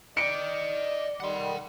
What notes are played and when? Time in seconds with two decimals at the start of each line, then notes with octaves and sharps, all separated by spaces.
0.17 D5 D#5 G5 C#7 D7
1.20 D#3 G3 F#5 C6